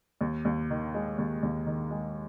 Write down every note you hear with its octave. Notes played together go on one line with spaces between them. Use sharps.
D#2
D#2
D#3
G#3
D#2
D#2
D#3
G#3